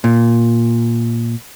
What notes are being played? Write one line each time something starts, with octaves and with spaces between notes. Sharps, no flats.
A#2